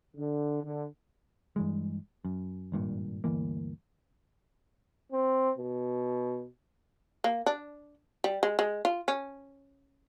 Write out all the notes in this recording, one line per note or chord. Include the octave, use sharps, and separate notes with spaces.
D3
D3
G2 E3 G#3
F#2
G#1 G2 A#2
G1 D2 E3 A#3
C4
B2
A#3
D4
G3
G#3
G#3
F4
C#4